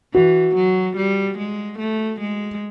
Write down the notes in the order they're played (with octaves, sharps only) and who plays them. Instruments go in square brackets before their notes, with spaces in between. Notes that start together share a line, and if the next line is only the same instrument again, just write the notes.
[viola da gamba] E3 [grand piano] F#4
[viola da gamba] F#3
G3
G#3
A3
G#3